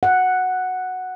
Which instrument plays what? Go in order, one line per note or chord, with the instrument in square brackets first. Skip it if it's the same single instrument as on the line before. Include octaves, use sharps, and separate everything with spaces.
[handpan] F#5